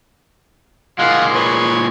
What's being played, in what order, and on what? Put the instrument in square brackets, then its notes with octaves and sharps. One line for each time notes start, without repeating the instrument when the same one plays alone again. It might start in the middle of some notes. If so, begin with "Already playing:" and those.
[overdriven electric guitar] A#2 G#3 [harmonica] F4 F#5
[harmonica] B4 C#5